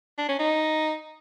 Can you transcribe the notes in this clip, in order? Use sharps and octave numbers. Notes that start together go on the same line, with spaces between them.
D4
C#4
D#4